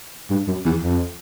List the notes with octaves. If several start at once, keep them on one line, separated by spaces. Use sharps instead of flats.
G2
F#2
E2
F2